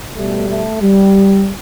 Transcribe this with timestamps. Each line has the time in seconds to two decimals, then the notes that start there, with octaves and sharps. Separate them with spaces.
0.16 B2 G3 A3
0.49 A3
0.81 G3